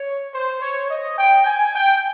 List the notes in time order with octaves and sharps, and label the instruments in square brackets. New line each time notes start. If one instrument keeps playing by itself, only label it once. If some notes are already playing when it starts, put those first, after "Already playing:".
Already playing: [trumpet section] C#5
C5
C#5
D#5
G5
G#5
G5